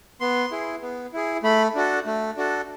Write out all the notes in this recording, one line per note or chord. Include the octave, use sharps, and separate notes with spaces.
B3 C6
E4 G#4
B3
E4 G#4
A3 B5
D4 F#4 A4
A3
D4 F#4 A4